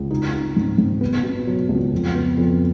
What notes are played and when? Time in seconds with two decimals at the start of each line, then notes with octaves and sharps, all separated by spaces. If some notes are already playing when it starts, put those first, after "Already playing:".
Already playing: C#2
0.11 D#4
0.33 D#4
0.56 G#2
0.78 G#2
1.01 B3
1.23 B2
1.47 F#3
1.69 C#2
1.93 F2
2.15 B3
2.37 F2